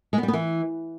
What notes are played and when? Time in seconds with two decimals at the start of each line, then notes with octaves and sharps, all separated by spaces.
0.13 G#3
0.18 B3
0.23 G3
0.28 B3
0.33 E3